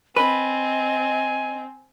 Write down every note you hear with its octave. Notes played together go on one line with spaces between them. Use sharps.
C4 B4 D#5 G#5